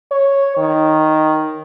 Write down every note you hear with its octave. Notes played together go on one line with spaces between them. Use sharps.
C#5
D#3